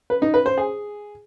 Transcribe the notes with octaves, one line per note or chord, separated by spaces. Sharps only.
B4
D#4
B4
C5
G#4